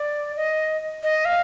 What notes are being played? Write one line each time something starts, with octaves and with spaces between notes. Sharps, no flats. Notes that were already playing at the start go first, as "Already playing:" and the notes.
Already playing: D5
D#5
D#5
F5